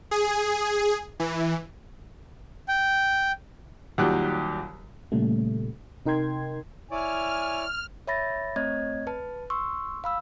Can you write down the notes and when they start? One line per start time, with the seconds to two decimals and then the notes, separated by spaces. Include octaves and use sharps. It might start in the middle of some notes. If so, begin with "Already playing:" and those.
0.11 G#4
1.20 E3
2.68 G5
3.98 D#2 A#2 F#3 G3 G4 F#6
5.12 A#2 C#3 G3 A3
6.06 C3 D#4 A#4 G5 C6 G#6
6.91 E4 C#5 D5 G#5 F6
8.07 C#5 E5 B5 A6 A#6
8.56 A3 C4 C#5 D#5 G#6
9.07 B4 A5
9.50 C6 C#6 E6
10.04 F5 B5 E6